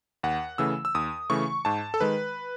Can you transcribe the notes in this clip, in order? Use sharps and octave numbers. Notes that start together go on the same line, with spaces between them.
D#2 F#5
C#3 E3 A3 E6
E6
D#2 D#6
C#3 E3 A3 C#6
G#2 A5
A4
D#3 G#3 B4